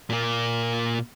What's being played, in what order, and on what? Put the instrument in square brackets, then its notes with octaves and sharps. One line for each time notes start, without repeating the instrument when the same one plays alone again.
[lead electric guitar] A#2 A#3